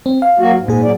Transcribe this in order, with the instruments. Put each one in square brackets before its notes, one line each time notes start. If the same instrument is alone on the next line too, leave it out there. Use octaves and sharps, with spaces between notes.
[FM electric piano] C4
F5
[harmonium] F#3 A#3 F#4
G#2
[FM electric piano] A#2 G#4
[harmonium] B2 F#3 D5